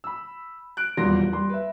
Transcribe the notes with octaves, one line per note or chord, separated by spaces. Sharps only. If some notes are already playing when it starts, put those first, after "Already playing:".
B5 E6
F#6 D7
D#1 E2 F#3 G3 C6 A#6
G3 C6
B4 E5